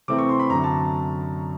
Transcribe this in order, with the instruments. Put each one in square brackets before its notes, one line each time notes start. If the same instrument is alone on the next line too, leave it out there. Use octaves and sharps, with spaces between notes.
[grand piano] C3 E3 A3 C4 D6
C#6
C6
B5
F#2 D3 F#3 A#5
A5